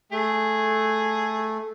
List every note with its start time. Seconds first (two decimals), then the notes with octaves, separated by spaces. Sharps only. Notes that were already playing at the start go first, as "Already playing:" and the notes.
0.12 A3 G#4